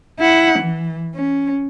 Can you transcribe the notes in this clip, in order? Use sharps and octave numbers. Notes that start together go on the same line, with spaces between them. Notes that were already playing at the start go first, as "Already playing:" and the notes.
E4 F#5
E3
C#4